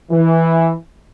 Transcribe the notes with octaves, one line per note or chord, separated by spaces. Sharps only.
E3